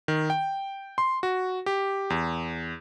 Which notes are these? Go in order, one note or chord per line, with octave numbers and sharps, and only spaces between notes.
D#3
G5
C6
F#4
G4
E2